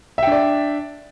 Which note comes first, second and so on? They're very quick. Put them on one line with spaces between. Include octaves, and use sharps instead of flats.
E5 G5 D4 D5